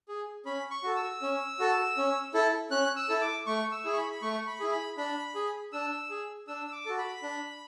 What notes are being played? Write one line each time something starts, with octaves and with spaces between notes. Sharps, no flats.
G#4
C#4 B5
C#6
F#4 A4
E6
C#4
F#4 A4
C#4
E4 A4
C#4 F#6
E6
E4 A4
D6
A3 C#6
E6
E4 G#4
C#6
B5
B5
A3 C#6
B5
E4 G#4
B5
D4 B5
G#4
D4 E6
G#4
D4 E6
E6
D6
F#4 A4
B5
D4